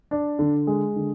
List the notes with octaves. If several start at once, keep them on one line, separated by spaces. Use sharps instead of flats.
D4
D3
G#3
D3